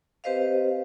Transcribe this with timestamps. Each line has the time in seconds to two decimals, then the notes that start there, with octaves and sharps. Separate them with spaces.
0.24 C4 G4 B4 C5 D#5 F5